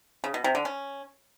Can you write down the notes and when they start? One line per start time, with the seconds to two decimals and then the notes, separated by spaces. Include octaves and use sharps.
0.24 C#3
0.34 B2
0.44 C3
0.55 D3
0.65 C#4